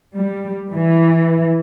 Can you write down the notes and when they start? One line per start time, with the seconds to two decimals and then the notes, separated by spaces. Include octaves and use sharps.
0.16 G3
0.72 E3